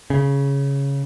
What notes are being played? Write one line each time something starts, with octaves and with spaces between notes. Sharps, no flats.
C#3